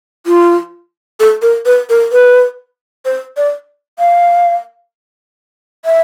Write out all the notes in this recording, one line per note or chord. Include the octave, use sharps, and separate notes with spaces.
F4
A4
A#4
B4
A#4
B4
C5
D5
F5
E5